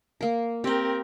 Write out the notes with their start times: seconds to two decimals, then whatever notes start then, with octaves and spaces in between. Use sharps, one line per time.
0.21 A#3 A#4
0.64 C4 G4 A#4 G5